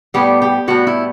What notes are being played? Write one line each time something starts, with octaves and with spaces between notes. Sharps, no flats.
A2 G3 B3 G4
G4
A2 G3 B3 F#4
E4